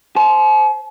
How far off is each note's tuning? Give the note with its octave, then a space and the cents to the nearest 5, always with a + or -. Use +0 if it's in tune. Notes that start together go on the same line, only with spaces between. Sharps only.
C5 +0 A5 -45